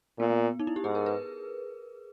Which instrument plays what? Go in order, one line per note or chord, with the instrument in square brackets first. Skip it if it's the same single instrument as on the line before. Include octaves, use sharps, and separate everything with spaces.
[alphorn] A#2 [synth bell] B3
[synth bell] B3
D#4
E4
G4
[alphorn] G#2 [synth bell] G#4
[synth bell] A#4
B4